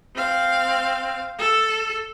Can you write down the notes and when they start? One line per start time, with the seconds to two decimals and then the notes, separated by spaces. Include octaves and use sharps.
0.16 C4 F5
1.39 A4